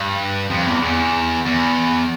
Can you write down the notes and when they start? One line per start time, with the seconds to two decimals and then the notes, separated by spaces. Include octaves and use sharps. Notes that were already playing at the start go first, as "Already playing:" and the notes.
Already playing: G2
0.50 F2
0.66 E2
0.82 E2
1.45 E2